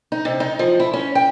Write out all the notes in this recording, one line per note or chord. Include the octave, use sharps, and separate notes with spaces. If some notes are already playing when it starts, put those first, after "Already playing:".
D#4
C3
D#4
F3
E4
C#4
G5